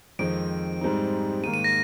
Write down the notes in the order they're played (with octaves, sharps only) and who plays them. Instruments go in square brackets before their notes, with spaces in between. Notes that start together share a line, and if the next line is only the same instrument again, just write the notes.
[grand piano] F2 D#3 G#3 C4 D#4 [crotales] D7
[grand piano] G#2 G3 C4 D#4
[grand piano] G#2 D#3 A#3 [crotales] D#7
[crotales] D#7
A#6